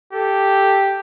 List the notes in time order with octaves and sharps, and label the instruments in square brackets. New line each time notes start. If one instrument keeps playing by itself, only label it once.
[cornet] G4 [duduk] A4